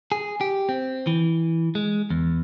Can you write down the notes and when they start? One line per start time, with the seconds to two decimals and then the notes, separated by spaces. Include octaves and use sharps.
0.12 G#4
0.41 G4
0.69 C4
1.07 E3
1.75 G#3
2.10 E2